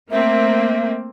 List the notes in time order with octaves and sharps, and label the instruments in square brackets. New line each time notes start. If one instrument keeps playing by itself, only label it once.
[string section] A3 A#3 C4 [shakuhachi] E5